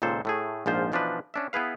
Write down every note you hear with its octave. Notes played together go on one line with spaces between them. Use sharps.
C#2 A#2 D#3 A4 C5
A2 A3 G#4
A#1 G#2 F3 F4 C5
B2 E3 F3 D4 D#4 B4
C#4 D4 E5
B3 E4 G#4 B4 F5